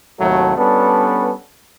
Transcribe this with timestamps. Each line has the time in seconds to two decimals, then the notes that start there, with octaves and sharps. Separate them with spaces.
0.20 D#2 A2 C3 F#3 A3
0.57 G3 B3 C#4 D4 A4 B4